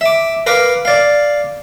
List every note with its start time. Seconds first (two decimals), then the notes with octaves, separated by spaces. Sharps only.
0.01 E5 D6
0.47 A#4 B4 F5 D6
0.85 D5 F5